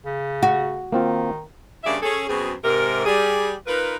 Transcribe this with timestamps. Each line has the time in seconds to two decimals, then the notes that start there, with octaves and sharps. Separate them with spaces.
0.05 C#3
0.43 F#4
0.92 D#3 A#3 C4 F4
1.84 G2 C#3 A#3 G#4 D5 E5
2.02 C#4 G#4 A4
2.27 F#2 B2 C4 G#4
2.64 G#2 C3 A#4
3.05 G3 G#4
3.66 D#4 F4 A#4 B4